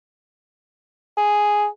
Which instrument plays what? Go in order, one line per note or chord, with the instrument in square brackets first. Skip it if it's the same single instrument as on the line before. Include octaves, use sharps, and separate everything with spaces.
[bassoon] G#4